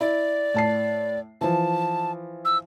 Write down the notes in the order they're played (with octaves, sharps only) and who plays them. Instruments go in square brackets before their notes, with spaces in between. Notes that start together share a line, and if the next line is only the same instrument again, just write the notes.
[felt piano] E4 [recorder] D5
[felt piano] A2 A5 C7
[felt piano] E3 F3 [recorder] A5
[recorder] E6